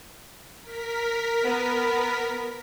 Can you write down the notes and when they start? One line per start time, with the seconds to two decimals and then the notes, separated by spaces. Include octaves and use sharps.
0.62 A#4 B6
1.43 B3